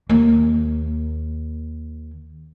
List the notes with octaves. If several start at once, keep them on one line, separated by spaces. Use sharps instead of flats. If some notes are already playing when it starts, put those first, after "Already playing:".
D#2 A#3